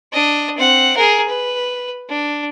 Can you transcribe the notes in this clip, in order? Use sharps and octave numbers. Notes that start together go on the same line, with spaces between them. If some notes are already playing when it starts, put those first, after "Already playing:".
D4 D#5
C4 F#5
G#4 A#4
B4
D4